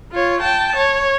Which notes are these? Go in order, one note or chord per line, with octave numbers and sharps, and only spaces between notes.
F4 C#5
G5 A5
C#5